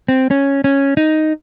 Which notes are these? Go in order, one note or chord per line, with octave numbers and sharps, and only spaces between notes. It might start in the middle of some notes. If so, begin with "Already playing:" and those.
C4
C#4
C#4
D#4